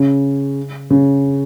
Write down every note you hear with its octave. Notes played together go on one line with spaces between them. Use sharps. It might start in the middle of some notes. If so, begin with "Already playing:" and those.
Already playing: C#3
C#3